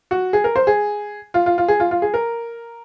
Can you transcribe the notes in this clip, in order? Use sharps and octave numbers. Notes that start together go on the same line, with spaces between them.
F#4
G#4
A#4
C5
G#4
F4
F4
F4
G#4
F4
F4
G#4
A#4